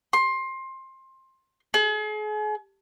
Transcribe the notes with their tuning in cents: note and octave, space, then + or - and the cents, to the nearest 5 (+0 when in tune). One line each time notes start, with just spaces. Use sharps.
C6 +20
G#4 +40